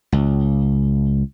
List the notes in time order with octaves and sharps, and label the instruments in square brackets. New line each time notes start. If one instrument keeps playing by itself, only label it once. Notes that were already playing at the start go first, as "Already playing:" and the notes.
[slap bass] C#2